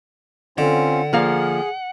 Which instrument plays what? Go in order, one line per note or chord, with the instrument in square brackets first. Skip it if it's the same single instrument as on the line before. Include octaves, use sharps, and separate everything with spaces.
[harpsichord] D3 [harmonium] C4 C#4 F4 [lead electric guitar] F#5
[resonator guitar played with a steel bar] F3 A#3 F5 [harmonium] G#4